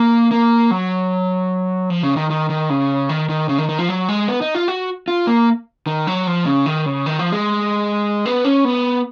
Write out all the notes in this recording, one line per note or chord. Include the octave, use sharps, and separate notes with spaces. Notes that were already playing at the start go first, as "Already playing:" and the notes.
Already playing: A#3
A#3
F#3
F3
C#3
D#3
D#3
D#3
C#3
D#3
D#3
C#3
D#3
D#3
F3
F#3
G#3
B3
D#4
F4
F#4
F4
A#3
D#3
F#3
F3
C#3
D#3
C#3
D#3
F3
G#3
B3
C#4
B3